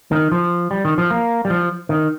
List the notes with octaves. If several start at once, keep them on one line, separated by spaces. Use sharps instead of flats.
D#3
F3
G3
D#3
F3
A#3
G3
F3
D#3